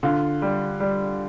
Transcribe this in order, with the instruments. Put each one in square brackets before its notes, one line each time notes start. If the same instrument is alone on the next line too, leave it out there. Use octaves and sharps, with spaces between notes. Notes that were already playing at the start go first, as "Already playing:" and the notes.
[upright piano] D3 [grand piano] F4
[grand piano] G3
G3